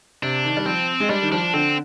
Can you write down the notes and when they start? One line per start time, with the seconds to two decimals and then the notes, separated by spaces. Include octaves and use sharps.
0.23 C3 D4
0.45 D#3
0.57 G3
0.66 F3 C4
1.00 G#3
1.09 G3 D4
1.22 D#3
1.32 F3 D4
1.54 D3 C4